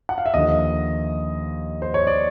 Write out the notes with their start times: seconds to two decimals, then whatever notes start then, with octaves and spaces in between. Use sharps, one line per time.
0.09 F#5
0.18 F5
0.26 E5
0.34 D#2 D3 F3 D#5
1.82 C5
1.94 C#5
2.07 D5